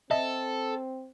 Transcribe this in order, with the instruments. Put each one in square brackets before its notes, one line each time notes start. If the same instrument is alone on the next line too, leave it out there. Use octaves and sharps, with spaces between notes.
[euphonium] C4 [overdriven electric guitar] A4 [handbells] D#5 E5